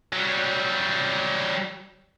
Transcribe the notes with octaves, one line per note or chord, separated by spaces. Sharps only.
F#3 G3